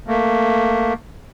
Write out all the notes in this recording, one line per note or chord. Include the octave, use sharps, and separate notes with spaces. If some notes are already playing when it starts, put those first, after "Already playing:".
A3 A#3